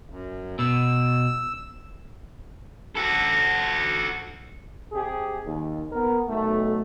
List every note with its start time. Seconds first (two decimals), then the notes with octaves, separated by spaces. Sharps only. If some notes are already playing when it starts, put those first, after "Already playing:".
0.10 F#2
0.59 B2 E6
2.95 F#4 A4
4.92 C3 G4 G#4
5.46 D#2
5.92 B3 A#4
6.28 B1 A3